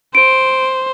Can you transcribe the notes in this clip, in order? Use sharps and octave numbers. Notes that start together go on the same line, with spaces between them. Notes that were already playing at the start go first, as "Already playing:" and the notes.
C5 D7